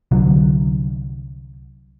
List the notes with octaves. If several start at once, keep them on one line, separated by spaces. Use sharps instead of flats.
C2 D3 F#3